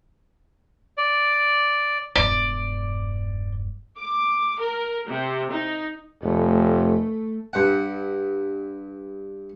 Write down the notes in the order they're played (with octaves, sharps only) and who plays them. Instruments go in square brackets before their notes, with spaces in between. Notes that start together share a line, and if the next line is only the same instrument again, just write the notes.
[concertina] D5
[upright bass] E1 G2 [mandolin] D5
[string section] D6
A#4
C3
D#4
[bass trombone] F1 [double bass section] A3
[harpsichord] G2 F#5